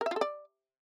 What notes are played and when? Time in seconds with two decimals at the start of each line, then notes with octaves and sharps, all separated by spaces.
0.01 A#4
0.06 E5
0.11 F4
0.16 A4
0.21 D5